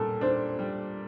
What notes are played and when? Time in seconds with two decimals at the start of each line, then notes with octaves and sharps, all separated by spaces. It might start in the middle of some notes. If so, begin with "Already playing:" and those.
Already playing: A#2 G3 A4
0.21 D4 C5
0.59 G3